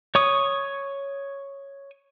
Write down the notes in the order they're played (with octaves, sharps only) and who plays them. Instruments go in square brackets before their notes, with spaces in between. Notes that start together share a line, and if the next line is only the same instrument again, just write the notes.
[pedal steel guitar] C#5 C#6 D#6